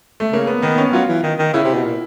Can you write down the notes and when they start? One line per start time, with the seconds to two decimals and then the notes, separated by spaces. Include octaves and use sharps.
0.20 A3
0.32 C#3 A#3
0.47 B3
0.62 D#3 B3
0.78 C#4
0.93 F#3 F4
1.08 E3
1.23 D#3
1.39 D#3
1.53 C#3 E4
1.64 C3
1.74 B2
1.84 A#2